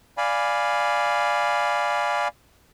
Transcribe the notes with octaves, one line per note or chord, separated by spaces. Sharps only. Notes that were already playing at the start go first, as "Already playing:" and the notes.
D5 F5 G#5 B5